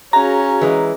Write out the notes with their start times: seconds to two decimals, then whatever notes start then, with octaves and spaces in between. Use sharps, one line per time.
0.13 C#4 F#4 G#4 F5 A#5
0.61 E3 G#3